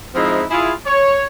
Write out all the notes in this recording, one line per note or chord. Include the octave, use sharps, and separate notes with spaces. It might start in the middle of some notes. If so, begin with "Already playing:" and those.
F3 G#3 C4 D#4 E4
E4 F4 G#4
C#5